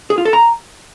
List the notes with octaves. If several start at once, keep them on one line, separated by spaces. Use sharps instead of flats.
G#4
F4
A4
A#5